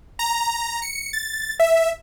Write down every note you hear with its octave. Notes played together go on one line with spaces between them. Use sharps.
A#5
C#7
A6
E5